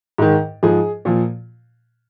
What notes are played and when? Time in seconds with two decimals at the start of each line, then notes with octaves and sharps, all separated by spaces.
0.18 G#2 D#3
0.63 G#2 F3 G#4
1.05 A#2 F3